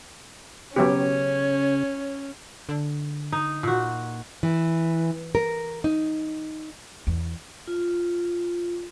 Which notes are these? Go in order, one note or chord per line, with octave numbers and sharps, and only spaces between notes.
C#3 F#3 B3 C#4 G4 C#5
D3
D#4
A#2 F#4
E3
A#4
D#4
E2
F4